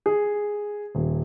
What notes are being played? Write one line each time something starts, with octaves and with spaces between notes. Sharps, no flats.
G#4
D#1